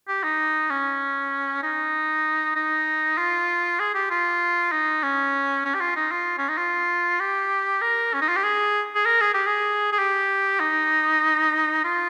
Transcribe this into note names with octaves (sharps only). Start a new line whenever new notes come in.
G4
D#4
C#4
D#4
D#4
F4
G#4
G4
F4
D#4
C#4
C#4
G4
F4
D#4
F4
C#4
D#4
F4
G4
A#4
C#4
D#4
F4
G4
G#4
G#4
A#4
G#4
G4
G#4
G#4
G4
D#4
F4